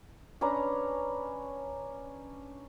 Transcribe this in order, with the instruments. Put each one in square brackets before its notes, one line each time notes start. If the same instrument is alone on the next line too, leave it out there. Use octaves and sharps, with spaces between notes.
[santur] C#4 D4 B4 A#5